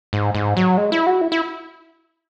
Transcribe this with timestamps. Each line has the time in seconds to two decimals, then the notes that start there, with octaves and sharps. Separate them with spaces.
0.13 G#2
0.35 G#2
0.57 F#3
0.78 G#3
0.92 E4
1.07 F#4
1.21 E4
1.32 E4